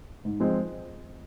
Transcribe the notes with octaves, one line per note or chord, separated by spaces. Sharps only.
G#2
F3 G#3 C4